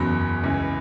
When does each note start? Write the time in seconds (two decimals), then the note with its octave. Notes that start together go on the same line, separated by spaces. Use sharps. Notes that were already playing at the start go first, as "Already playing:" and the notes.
Already playing: F#1 E2 C#3 F#3 B5
0.44 C#2 C#3 E3